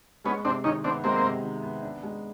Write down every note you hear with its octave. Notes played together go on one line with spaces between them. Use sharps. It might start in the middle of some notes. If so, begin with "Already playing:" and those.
G#3 B3 C#4
C3 C4 D4
D#3 C#4 D#4
B3 C4 D4
G#3 A#3 C4
C3
D#3
B3
D4
G#3